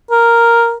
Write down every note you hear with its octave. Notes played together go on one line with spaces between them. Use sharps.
A#4